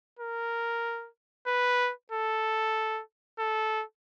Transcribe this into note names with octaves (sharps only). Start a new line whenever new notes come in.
A#4
B4
A4
A4